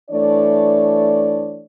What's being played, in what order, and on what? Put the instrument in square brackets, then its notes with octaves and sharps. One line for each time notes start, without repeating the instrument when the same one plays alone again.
[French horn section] E3 A3 D4 C#5 D5